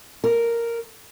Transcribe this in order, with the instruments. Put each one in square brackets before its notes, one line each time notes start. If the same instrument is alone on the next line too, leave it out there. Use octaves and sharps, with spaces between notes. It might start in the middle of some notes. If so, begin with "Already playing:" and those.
[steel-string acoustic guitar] A#4